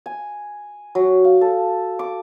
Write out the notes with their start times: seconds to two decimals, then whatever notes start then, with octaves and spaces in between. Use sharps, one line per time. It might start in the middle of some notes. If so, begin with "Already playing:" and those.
0.06 G#5
0.95 F#3
1.24 F5
1.41 A4
1.99 D6